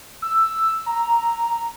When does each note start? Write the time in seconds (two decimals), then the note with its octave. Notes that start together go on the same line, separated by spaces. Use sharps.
0.22 E6
0.86 A#5